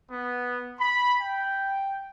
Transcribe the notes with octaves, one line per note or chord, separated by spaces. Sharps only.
B3
B5
G5